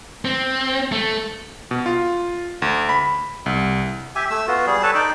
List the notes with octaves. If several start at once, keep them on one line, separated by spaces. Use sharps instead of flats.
C4
A3
B2
F4
D2
B5
C2
G4 E5 G#5
A3 E6
B3 F4 F#4
G3 G#4
A4 B4 C#5 A5
D#4 D5 G5